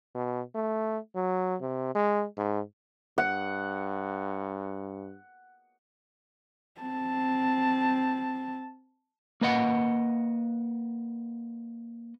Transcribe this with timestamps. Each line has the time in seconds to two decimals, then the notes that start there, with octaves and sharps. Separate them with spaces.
0.15 B2
0.55 A3
1.15 F#3
1.61 C3
1.95 G#3
2.37 G#2
3.18 G2 F#5
6.81 C4 A5
9.41 A#3 B4 D#5 F#5